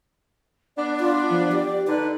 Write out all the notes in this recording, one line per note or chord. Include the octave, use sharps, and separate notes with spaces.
B3 D4 D5
F4 D5
F3
G4
D3 D#4 B4